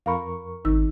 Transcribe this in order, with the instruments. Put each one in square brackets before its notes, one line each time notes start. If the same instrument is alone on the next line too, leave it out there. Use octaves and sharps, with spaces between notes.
[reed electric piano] F2 A#4 C#6 [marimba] F5 B5
[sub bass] G#1 [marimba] D#3 D#4 E6